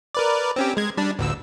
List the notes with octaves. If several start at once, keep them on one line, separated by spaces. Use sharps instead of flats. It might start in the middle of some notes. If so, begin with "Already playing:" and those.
A#4 B4 D5
C4 C#4 G4
G#3 G#6
G3 D4
A1 D2 E6